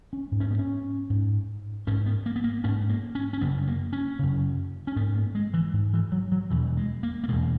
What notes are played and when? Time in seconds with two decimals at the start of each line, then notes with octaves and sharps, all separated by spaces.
0.13 C#4
0.32 G#2
0.40 C#4
0.51 B3
0.59 C#4
1.10 G#2
1.87 G#2 C#4
2.06 B3
2.26 A#3
2.36 B3
2.44 A#3
2.64 G#2 C#4
2.89 A#3
3.15 C#4
3.33 C#4
3.41 F#2 C#3 B3
3.67 A#3
3.93 C#4
4.19 F#2 C#3
4.87 C#4
4.96 G#2 B3
5.15 A#3
5.35 G#3
5.54 E3
5.73 G#2
5.94 E3
6.12 F#3
6.32 F#3
6.50 E2 B2 E3
6.77 G#3
7.03 A#3
7.24 A#3
7.28 B2 G#3
7.31 E2